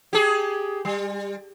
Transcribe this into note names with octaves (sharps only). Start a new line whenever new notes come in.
G4 G#4
G3